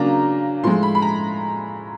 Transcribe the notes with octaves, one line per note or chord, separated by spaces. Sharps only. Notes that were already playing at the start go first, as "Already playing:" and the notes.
Already playing: C#3 F#3 A#3 D4 A#5
A2 F3 G#3 C6
B5
B5
A#5